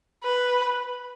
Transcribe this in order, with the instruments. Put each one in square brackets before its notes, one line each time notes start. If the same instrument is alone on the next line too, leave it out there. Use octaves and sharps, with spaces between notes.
[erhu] B4